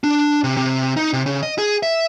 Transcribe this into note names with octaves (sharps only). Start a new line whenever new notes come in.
D4
C3
C3
D#4
C3
C#3
D#5
G#4
E5